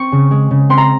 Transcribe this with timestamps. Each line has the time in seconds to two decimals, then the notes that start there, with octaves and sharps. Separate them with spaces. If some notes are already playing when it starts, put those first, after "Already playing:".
Already playing: C4 C#6
0.12 C#3
0.31 G#3
0.51 C#3
0.70 C4 C6
0.78 A#5